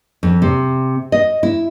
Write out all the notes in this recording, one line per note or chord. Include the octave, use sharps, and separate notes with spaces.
F2
C3
D#5
E4